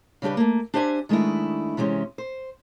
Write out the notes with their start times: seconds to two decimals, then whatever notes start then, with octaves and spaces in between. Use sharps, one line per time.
0.22 C#3 G3 D4 G4 B4
0.37 A3 A#3
0.74 D4 G4 C5 E5 F#5 G#5
1.09 D#3 G#3 A3 D4 E4
1.77 C3 E3 G#3 C#4 G4
2.18 C5